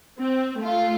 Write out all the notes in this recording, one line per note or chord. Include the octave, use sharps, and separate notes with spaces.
C4
A3 F4